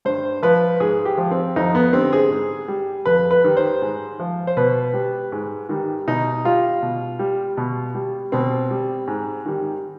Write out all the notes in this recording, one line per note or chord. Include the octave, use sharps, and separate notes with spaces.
G2 C5
F3 B4
G#2 G#4
G4
F3
C4
F2 D#4
B3
D3 G3 C4
G#4
G#2
G3
F2 B4
B4
D#3 G3
C5
G#2
F3
C5
B2 B4
G3
G#2
D#3 G3
B2 D#4
G3 F4
B2
G3
B2
G3
B2 C4
G3
G#2
D#3 G3